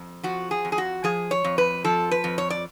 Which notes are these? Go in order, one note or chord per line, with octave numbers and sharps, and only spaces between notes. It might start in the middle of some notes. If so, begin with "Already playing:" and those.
Already playing: F2
F3 F#4
G#4
F2
G#4
F#4
F3 G#4
C#5
F2
B4
F3 A4
B4
F2
C#5
D5